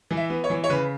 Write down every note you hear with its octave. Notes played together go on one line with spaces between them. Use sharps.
E3
E5
B3
C#5
E3
C#5
C#3 B4